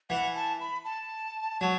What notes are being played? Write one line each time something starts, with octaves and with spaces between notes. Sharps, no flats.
E3 F#5
A5
B5
A5
F#3